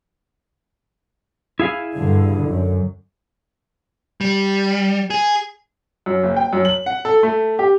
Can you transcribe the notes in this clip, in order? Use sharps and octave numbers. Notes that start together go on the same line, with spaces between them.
E4 G#4 F5
G2 D3
F#2
G3
G#4
F#2
F#1
G5
F#2
F#7
F#5
A4
A3
G4